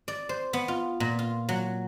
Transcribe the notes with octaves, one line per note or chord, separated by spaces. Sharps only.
D5
C5
B3
F4
A#2
F4
F#3